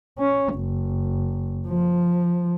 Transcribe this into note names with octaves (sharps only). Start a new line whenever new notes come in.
C#4
F#1
F3